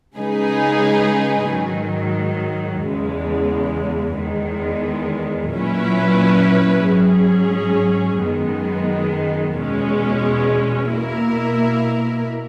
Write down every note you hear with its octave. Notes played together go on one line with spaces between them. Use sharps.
C#3 G#3 D#4 G#4 B4
G#2 D#3 F#3
E2 C#3 G#3
E2 D#3 G#3
A#2 F#3 C#4 E4 B4
G#2 F#3 C#4 G#4
F#2 D#3 G#3 B3
E2 B2 G#3 C#4
B2 A#3 E4 A#4